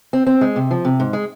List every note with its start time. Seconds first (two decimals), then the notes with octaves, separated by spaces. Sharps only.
0.13 C4
0.27 C4
0.41 G#3
0.56 C3
0.71 F3
0.85 C3
1.00 G#2
1.13 G#3